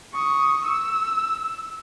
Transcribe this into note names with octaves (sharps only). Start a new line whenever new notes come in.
C#6 D#6
E6